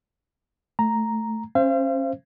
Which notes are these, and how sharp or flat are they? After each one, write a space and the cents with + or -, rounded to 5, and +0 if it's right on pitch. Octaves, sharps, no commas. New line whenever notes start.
A3 +0 A#5 +0
C#4 -30 C5 +0 F5 -40